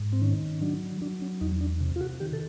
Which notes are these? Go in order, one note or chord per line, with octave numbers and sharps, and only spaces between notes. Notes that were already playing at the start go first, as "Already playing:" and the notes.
Already playing: G#2
C4
D#3 C#4
F#3 D4
F#3 D4
C#4
E2 D#4
D4
C3
F4
F#4
D#3 G4
A4